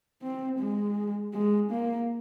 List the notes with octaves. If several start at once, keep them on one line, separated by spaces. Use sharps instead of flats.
C4
G#3
G#3
A#3